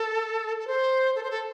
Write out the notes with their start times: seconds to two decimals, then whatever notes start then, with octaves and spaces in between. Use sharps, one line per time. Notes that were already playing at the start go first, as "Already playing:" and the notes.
Already playing: A4
0.59 A4
0.67 C5
1.15 A4
1.23 C5
1.30 A4